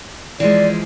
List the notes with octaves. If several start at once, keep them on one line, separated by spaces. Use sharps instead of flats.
E3 F3 G#3 D5